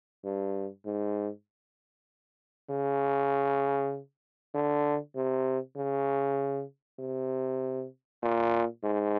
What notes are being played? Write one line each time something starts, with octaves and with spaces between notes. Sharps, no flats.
G2
G#2
C#3
D3
C3
C#3
C3
A#2
G#2